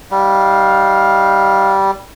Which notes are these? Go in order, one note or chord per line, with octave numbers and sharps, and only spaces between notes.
G3 D#4 F5